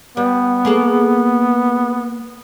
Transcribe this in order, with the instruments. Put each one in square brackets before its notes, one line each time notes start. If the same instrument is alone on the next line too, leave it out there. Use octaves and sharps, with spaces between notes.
[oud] G3 [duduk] B3
[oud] A#3 G#4 A4